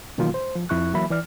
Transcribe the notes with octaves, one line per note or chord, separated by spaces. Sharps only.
B2 D#3 E3 F#3 A#3 F4
C5
F3
F2 E4 C#6 F#6
E3 F#3 A#3 E5 B5
E3 D5 F6